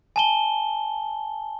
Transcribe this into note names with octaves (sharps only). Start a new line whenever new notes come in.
G#5 A5 G7